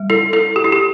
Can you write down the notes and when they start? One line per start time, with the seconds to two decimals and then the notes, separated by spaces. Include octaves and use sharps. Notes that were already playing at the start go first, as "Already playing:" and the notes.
Already playing: G3
0.10 E4 A4
0.33 E4 A4
0.56 G4
0.65 E4
0.72 G4